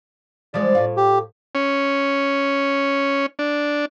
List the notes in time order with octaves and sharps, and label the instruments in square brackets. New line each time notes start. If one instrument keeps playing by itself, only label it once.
[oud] E3 F3 G#3 [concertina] D5
[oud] A2 F4
[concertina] G4
[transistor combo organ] C#4
D4